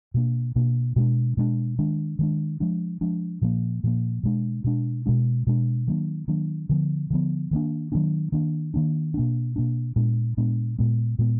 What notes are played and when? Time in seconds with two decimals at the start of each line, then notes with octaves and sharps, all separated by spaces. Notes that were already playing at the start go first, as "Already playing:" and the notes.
0.14 B2 A#3 D4
0.56 B2 A#3 D4
0.96 B2 G#3 B3 D4
1.37 B2 G#3 B3 D4
1.79 D#3 G#3 D4
2.19 D#3 G#3 D4
2.60 F3 G#3 D4
3.01 F3 G#3 D4
3.41 A#2 F3 A#3
3.84 A#2 F3 A#3
4.23 B2 G#3 D4
4.64 B2 G#3 D4
5.06 B2 G#3 D4
5.47 B2 G#3 D4
5.87 D#3 F#3 A#3 D4
6.28 D#3 F#3 A#3 D4
6.69 D3 F3 B3
7.10 D3 F3 B3
7.51 D#3 F#3 A#3 D4
7.92 D#3 F#3 A#3 D4
8.32 D#3 A#3 D4
8.74 D#3 A#3 D4
9.14 B2 A#3 D4
9.56 B2 A#3 D4
9.96 A#2 G#3 B3 D4
10.37 A#2 G#3 B3 D4
10.78 A#2 G#3 B3
11.19 A#2 G#3 B3